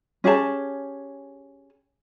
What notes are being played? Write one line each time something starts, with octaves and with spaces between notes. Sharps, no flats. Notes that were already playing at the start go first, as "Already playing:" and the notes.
C#4 G4 G#4 A5